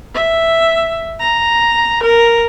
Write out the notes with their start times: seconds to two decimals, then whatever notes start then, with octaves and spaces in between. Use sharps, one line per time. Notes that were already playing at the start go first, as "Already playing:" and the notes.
0.15 E5
1.20 A#5
2.03 A#4